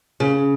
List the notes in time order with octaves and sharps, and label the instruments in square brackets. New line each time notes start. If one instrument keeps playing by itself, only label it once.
[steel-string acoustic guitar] C#3